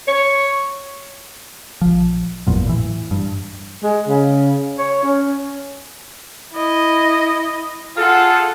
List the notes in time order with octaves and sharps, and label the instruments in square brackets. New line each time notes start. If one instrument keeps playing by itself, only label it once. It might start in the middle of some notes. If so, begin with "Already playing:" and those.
[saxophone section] C#5
[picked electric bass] A#1 F3
G#1 E2 A#2 F#3
A2 E3
G2
[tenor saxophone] G#3
C#3
C#5
C#4
[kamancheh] E4 D#5
[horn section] F4 A4 [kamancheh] G#4 F#5